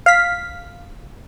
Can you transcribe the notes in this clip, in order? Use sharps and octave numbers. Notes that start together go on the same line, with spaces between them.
F5 B6